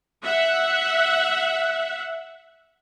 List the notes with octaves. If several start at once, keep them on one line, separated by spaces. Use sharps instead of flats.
E5 F#5